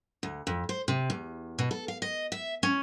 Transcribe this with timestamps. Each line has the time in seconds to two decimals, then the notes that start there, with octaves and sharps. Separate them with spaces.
0.23 D2
0.47 F2
0.69 C5
0.88 C3
1.10 E2
1.59 B2
1.71 A4
1.88 F5
2.02 D#5
2.32 E5
2.63 C#4